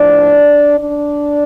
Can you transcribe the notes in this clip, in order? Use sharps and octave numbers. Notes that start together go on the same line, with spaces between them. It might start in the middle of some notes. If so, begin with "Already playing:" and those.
Already playing: A2 F3 D4 D5
D4 D5